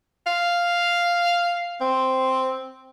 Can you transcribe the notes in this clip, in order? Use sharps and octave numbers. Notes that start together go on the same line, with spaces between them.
F5
C4